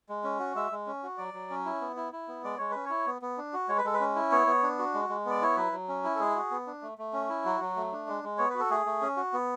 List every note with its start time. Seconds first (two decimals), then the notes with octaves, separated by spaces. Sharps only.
0.09 G#3
0.24 C#4
0.39 F#4
0.55 G#3 E5
0.71 G#3
0.87 C#4
1.03 F#4
1.18 F#3 D5
1.34 F#3
1.50 C#4
1.65 E4
1.81 B3
1.96 E4
2.13 E4
2.28 B3
2.44 G#3 D5
2.58 G#3 C#5
2.71 C#4 B4
2.85 E4 C#5
3.06 B3
3.22 B3
3.37 D4
3.53 F#4
3.68 G#3 C#5
3.78 B4
3.84 G#3 A4
3.94 B4
4.00 C#4
4.15 E4
4.31 B3 C#5
4.47 B3
4.63 D4
4.79 F#4
4.94 G#3
5.09 G#3
5.26 B3 D5
5.41 E4 C#5
5.56 F#3 B4
5.72 F#3
5.88 C#4
6.04 E4
6.15 A4
6.20 G#3 G#4
6.35 F#4
6.51 B3
6.67 D4
6.82 A3
6.98 A3
7.13 C#4
7.29 E4
7.45 F#3 F#4
7.60 F#3
7.76 A3
7.92 D4
8.08 G#3
8.24 G#3
8.38 B3 C#5
8.50 F#4 B4
8.60 A4
8.70 A3 G#4
8.86 A3
9.02 C#4
9.17 F#4
9.33 B3